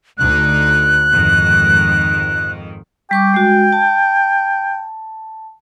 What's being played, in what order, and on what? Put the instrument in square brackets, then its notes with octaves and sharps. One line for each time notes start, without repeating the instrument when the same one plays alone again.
[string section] D2 D3 D#4 [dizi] F#6
[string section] F2 G#2 D#3
[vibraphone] G3 C#6 D6 [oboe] G5
[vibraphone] G#3 F#4
A5